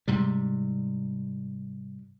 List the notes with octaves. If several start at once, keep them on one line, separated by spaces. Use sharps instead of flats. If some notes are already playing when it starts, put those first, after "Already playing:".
G#2 C3 G3